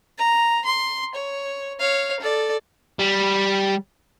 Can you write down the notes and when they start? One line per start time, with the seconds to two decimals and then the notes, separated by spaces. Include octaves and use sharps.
0.18 A#5
0.65 C6
1.15 C#5
1.80 C#5 F5
2.20 A4 D5
2.99 G3